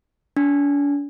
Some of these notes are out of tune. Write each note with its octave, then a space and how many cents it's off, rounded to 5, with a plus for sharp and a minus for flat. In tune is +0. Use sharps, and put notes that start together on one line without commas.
D4 -45